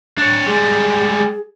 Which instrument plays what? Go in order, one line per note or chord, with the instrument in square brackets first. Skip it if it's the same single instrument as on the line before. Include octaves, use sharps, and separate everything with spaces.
[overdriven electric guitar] D4 C#5
[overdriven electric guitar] G3 G#3 [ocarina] G#4